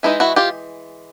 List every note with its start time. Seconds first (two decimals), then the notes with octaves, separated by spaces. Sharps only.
0.03 E3 G#3 C4 D#4 E4
0.20 E4 F#4
0.36 F4 G4